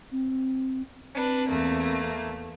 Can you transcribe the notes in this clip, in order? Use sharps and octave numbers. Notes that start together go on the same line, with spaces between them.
C4
C4 D4 B4
E2 A3 A#3